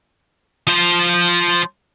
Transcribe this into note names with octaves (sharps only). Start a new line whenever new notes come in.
F3 C5